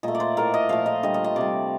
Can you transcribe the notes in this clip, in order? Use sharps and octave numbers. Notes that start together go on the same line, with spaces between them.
A#2 A3 D#5
D5
C5
A2 A3 A#4
D#5
A#2 F3 A3 F5
D#5
D3 G3 D#5
D#5
D#5
C3 G3 D5